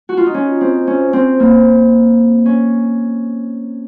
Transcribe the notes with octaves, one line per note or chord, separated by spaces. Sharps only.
F#4
F4
D#4
C#4
C4
C#4
C4
A#3
C#4